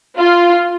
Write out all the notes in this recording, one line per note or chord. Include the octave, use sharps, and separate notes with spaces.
F4